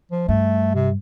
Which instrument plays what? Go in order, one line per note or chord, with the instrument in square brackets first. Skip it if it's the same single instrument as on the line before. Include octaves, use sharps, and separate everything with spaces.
[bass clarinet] F3
[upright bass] G2 [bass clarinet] A3
[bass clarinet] C3